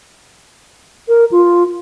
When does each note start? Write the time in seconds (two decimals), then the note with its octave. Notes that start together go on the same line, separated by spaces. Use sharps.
1.08 A#4
1.31 F4